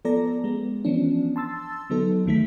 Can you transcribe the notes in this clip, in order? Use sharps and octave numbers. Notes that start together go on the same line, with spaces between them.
F3 B3 A4 D5 A#5 A#6
G#3 B3
E3 F3 B3 C#4 D4
A5 C6 E6 A6
D3 F#3 B3 D#4 A4
C#2 G#2 D#3 A3 A4 B6